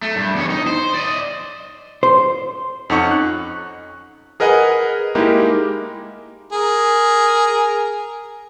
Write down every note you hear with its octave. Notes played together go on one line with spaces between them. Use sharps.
A3
G2
E2 C#5
D#4
C5
D5 D#5
C5
F2 C#4 D#4 F#5 C#6
F#6
G#4 A#4 B4 D#5 F#5 G#5
G#3 A#3 D#4 E4 G4 A#4
G#4 A#4